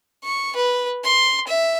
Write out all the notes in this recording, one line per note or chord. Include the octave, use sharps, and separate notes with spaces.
C#6
B4
C6
E5